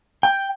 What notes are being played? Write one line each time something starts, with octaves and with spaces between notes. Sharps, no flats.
G5